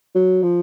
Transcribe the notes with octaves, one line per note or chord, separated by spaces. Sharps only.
F#3
F3